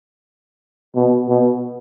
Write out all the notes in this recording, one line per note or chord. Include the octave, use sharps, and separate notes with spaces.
B2
B2